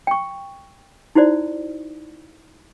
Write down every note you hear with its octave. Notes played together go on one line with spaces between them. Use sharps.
G5 C#6
D#4 E4 F#4 C5 D5